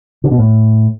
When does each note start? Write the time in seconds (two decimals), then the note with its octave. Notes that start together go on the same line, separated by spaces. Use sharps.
0.24 D3
0.31 B2
0.38 A2